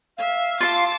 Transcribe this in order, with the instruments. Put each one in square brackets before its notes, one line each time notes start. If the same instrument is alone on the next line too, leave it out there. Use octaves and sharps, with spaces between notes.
[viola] E5 [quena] F5
[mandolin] F4 C6 [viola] A5 D6